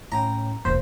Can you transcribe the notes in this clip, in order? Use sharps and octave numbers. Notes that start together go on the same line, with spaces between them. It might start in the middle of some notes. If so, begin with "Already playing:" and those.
A2 C#4 G5 A#5
E1 C2 A#3 C5 B6